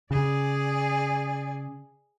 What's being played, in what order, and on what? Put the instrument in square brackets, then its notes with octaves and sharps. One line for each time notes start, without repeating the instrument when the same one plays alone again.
[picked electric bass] C#3 [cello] G#4 D5